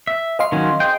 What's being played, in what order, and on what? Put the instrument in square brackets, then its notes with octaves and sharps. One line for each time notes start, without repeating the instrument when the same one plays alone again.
[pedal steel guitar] E5
[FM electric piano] D#5 F5 C6
[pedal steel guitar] D#3 F#3 C#4
G#4 C5 G5